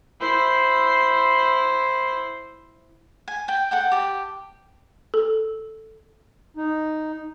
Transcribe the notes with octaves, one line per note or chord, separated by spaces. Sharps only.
E4 C5
G#5
G5 A5
A4 F#5 G5
G4 A5
A4
D#4